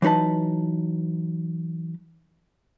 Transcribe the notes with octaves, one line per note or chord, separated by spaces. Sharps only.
E3 F#3 D#4 B4 A5